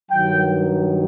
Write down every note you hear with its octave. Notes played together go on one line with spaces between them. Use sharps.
G2 D#3 F#3 G5